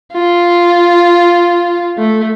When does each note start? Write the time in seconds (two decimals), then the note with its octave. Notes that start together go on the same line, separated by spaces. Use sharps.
0.13 F4
1.98 A3